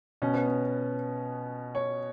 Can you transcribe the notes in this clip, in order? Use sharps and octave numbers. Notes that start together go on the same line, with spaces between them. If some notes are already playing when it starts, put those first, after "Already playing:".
B2 C#4
B3
C#4
C#5